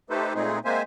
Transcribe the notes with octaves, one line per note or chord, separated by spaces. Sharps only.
A3 D#4 G4 A4 B4 C5
A#2 G#3 A3 C4 D#4 G#4
G#3 A#3 C4 C5 E5 G#5